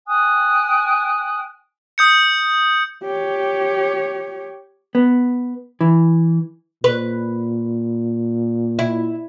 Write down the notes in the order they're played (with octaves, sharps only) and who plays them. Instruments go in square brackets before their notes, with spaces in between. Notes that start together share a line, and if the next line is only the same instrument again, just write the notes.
[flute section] G5 G#5 D#6 F#6
[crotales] D#6 G6 C#7
[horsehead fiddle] G4 C#5
[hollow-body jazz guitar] B3
E3
[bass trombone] A#2 [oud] B4
[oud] E4